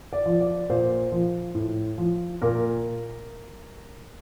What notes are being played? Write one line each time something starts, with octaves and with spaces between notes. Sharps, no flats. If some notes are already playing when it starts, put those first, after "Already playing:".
D5
F3
D5
A#2 C5
F3
A2
F3
A#2 A#4